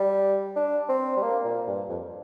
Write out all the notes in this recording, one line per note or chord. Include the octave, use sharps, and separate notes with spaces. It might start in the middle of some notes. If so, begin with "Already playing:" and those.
Already playing: G3
D4
C4
G3
A#3
A#2
G2
F2